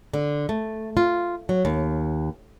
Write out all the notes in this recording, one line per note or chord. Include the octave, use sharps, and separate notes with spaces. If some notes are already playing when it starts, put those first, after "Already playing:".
D3
A3
F4
F#3
D#2